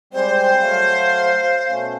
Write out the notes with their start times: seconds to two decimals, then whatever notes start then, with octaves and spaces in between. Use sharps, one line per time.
0.13 G3 G#3 C4 C5
0.60 F#3 A3 F5
1.69 B2 A3 C#4